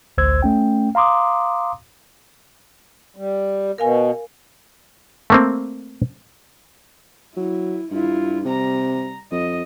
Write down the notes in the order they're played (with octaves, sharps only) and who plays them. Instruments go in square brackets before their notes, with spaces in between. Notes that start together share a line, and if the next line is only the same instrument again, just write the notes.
[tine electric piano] A1 D2 C5 E6 G#6
A3 C#4 G5
F5 A#5 C6 D6 D#6
[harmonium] G3
[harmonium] B2 [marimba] A#4 F5 G#5
[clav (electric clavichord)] A3 A#3 C4
[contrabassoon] F#3 [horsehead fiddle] E4
[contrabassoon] G2 [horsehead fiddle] E4 F4
[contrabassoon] C3 [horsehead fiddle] G3 A#5
[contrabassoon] F2 [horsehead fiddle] D#5